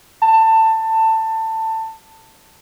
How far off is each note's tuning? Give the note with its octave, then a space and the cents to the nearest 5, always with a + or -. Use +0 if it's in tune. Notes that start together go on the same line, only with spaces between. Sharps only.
A5 +20